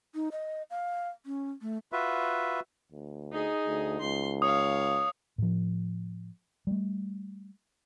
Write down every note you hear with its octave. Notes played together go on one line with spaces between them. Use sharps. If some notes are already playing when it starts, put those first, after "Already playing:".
D#4
D#5
F5
C#4
A3
F4 F#4 B4 E5
D2
D#4 G#4
D2
C#2 C6
C#5 F5 D#6
A2 F3
G3 A3